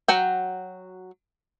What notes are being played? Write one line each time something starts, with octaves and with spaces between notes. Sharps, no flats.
F#3 F#4 G5